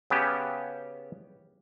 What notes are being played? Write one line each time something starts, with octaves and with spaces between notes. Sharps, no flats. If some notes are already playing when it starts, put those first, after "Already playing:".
C#3 B3 C#4 G4 A5